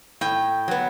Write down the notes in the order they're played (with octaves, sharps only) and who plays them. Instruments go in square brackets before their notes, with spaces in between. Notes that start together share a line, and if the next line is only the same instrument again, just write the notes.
[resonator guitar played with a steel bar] A2 [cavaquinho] G5
[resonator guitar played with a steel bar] F#3 B3